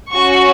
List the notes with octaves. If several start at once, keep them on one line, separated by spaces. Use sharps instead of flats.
C#4 F#4 C#6